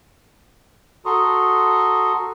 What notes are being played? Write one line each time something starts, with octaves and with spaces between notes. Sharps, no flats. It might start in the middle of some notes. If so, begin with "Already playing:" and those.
F#4 A4 A#5 C6 C#6 D#6